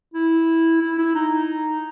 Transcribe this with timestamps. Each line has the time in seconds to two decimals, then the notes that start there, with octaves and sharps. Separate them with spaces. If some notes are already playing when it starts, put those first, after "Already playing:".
0.14 E4
0.82 E4
0.98 E4
1.15 D#4